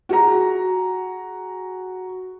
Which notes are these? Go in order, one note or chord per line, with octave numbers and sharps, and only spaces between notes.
F#4 G#4 A#5